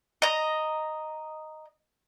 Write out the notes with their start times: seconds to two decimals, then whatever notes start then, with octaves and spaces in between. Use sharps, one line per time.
0.22 D#5 A#5